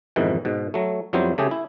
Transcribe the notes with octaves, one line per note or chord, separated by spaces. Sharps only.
F2 G#2 B2 D#3 E3
G#2 B2
F#3 A3
F2 F#3 G3 B3 E4 C5
C#3 A3 G4 G#4
E4